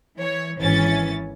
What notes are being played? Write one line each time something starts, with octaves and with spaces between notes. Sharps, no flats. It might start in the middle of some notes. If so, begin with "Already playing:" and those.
E3 C#5
G#1 E3 C#4 A6